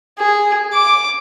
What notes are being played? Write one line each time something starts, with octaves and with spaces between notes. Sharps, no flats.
G#4
D6